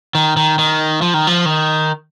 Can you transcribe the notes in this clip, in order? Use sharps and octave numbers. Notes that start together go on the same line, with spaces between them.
D#3
D#3
D#3
F3
D#3
F3
D#3